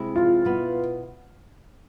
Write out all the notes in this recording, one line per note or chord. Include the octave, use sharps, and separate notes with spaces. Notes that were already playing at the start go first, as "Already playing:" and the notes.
Already playing: C3 G#3 C4 E4
F4
B2 B3 E4 B4